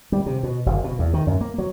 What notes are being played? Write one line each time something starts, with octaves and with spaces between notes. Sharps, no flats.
G3
C3
B2
F#1
B2
E2
D#3
F#2
A#3
F#3